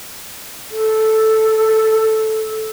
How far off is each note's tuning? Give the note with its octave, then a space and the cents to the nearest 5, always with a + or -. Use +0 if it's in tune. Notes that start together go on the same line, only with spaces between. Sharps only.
A4 -5